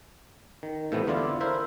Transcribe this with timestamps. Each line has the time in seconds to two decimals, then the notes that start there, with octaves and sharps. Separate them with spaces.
0.63 D#3
0.92 A2 C3 E3 A3 B3
1.07 E2 D3 E4 F4 D5
1.41 E4 A#4 C5 E5